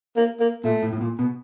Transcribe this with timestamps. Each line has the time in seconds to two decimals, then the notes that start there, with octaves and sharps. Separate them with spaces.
0.17 A#3
0.40 A#3
0.64 A#2 A3
0.83 A2
0.93 A2
1.01 A#2
1.19 B2